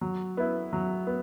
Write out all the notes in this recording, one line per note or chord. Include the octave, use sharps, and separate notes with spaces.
F#3
B3 E4
F#3
B3